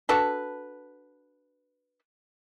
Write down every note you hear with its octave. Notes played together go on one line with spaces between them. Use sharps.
D4 F#4 A4 B4